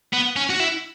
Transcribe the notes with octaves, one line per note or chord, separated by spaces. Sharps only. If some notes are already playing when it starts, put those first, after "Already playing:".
B3
C#4
F#4
E4